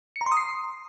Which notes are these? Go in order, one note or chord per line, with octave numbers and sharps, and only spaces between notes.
C#7
A#5
C6
D#6
C7